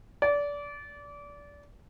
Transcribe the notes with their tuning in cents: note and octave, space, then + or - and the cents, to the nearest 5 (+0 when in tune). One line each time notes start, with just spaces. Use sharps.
D5 -25